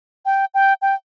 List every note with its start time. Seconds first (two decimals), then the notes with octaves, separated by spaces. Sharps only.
0.26 G5
0.54 G5
0.82 G5